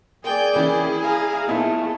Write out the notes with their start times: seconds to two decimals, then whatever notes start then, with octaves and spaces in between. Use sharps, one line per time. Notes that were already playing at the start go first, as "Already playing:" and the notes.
0.24 A#3 G#4 D5 G5 G#5 G6
0.56 E3 A#3 C#4 E4
1.02 F5 G#5 A#5
1.48 A#2 A3 B3 D#4 E4